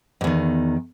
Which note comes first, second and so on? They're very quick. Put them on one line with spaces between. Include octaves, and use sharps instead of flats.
G2 E2 D#3